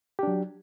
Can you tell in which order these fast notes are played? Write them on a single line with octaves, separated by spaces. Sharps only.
G4 D4 F#3